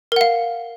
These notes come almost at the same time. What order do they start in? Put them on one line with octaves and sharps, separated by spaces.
A#4 F#5 F5